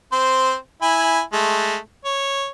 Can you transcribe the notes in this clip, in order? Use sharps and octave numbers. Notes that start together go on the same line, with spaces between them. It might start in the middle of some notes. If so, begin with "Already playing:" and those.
C4 C5
E4 G#5 B5
G#3 A3
C#5